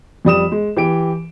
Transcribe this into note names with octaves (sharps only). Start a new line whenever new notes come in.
F2 G3 D#6 E7
G#3
E3 G4 D7